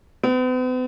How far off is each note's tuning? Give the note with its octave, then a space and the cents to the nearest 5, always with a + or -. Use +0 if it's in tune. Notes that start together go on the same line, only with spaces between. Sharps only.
B3 +45